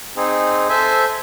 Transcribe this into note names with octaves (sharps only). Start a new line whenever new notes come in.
C4 D#4 G#4
A4 C5 E5 G#5